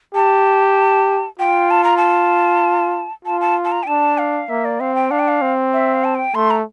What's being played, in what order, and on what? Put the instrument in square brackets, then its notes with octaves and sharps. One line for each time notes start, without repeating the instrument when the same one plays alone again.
[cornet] G4 [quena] A5
[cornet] F4 [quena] G5
[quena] A5
A#5
A5
[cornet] F4 [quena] A5
[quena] A5
A5
A#5
G5
[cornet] D4 [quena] A5
[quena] F5
[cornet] A#3 [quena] E5
[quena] D5
[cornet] C4 [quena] F5
[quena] G5
[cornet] D4 [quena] F5
[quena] G5
F5
[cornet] C4
[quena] E5
F5
A5
G5
[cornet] A3 [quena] C6
[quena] A#5